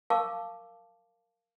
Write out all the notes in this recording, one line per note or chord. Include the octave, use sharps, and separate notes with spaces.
A#4 F5 A5 C#6 D6